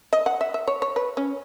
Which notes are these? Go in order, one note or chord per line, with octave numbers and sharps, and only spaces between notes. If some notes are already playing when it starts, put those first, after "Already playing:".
D#5
F#5
E5
E5
C#5
C#5
B4
C#4